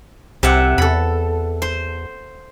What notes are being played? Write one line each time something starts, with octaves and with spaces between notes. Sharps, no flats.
C2 C3 E5 F#5
E2 A4 B5
C5